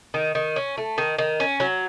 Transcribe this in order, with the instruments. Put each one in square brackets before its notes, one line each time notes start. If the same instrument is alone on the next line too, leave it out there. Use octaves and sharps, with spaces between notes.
[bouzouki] D#3
D#3
C#4
A3
D#3
D#3
C#4
F#3